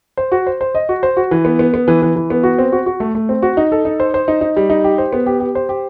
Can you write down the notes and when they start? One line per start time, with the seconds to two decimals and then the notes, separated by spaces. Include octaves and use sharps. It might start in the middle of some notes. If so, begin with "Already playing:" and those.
0.17 C5
0.32 F#4
0.47 C5
0.61 C5
0.75 D#5
0.89 F#4
1.03 C5
1.17 F#4
1.31 E3
1.45 B3
1.59 B3
1.74 B3
1.88 E3
2.02 E3
2.16 E3
2.30 B3
2.43 F#4
2.58 C4
2.72 F#4
2.86 F#4
3.00 A3
3.15 A3
3.29 C4
3.42 F#4
3.57 D#4
3.72 A4
3.85 D#4
4.00 C5
4.14 C5
4.28 D#4
4.41 D#4
4.56 G3
4.70 D#4
4.84 G4
4.98 C5
5.13 B3
5.26 G4
5.40 G4
5.55 C5
5.69 G4